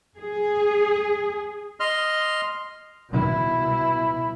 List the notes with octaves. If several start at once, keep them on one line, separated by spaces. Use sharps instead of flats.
G#4
D#5 C6 F6
B2 E4